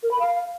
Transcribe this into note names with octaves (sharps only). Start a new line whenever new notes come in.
A#4
B5
F5